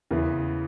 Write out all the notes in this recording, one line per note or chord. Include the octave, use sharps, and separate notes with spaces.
E2 C#3 E3